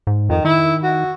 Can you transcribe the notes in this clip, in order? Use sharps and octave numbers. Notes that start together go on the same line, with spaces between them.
G#2
F2 D#3
D#3 E4
F#4